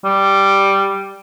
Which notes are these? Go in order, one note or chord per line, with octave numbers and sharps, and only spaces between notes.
G3